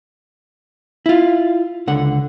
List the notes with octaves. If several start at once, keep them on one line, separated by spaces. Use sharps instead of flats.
E4 F4
C#2 D3 F#5